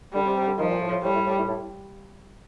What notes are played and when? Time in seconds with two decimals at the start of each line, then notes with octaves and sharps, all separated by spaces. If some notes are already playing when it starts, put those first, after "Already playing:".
0.13 D3 G3
0.25 C3
0.36 C3
0.46 D3
0.58 D#3 F3
0.70 A#2
0.80 A2
0.91 A2
1.03 A2 G3
1.14 A2
1.26 A2
1.37 A2
1.48 A2